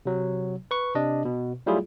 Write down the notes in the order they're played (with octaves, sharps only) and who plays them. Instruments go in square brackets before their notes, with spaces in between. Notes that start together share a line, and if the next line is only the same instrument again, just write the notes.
[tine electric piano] C3 F#3
B4 C#6
C3 D4 D#5
B2
F#3 G3 A3 E4 F4 G#4